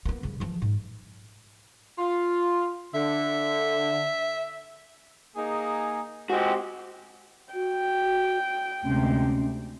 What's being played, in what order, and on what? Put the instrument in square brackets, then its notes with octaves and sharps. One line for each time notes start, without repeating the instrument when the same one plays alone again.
[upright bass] A#3 B3
C#3 G3
E3 F3
G#2
[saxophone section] F4
[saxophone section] D3 [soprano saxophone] E5
[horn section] A#3 D#4 G#4
[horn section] G#3 C4 [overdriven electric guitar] F#4 G4
[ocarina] F#4 [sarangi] G5
[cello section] D2 C3 G#3 [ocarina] C#4